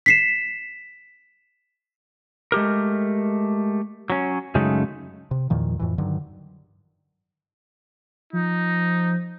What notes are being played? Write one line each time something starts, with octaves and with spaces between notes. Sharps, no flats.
B6 C7 E7
G#3 A3 G4 A#4
F#3 C#4
F#2 C#3 G#3 A3 D#4
C3
E2 A#2 D#3 F3
F2 A2 E3
G2 D3 D#3 F#3
F3 D#4